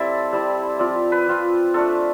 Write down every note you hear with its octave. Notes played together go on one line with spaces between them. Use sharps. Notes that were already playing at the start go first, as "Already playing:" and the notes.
Already playing: G3 C4 E4 A4 D5 E5
G3 C4 E4
F3 C4 F4 D5
B4
F3 C4 F4
A3 D4 F4 A4